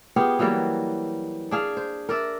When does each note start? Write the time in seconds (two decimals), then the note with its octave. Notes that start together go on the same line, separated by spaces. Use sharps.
0.16 B3 F4 G4 G#4
0.39 E3 F#3 G3 A#3
1.51 D4 G#4 F5
1.77 C5
2.09 A#4 D5 E5